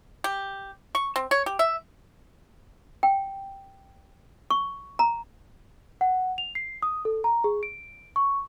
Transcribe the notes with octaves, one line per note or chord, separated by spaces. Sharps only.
G4
C#6
C4
C#5
G4
E5
G5
C#6
A#5
F#5
F7
C7
D#6
A4
A#5
G#4
D7
C#6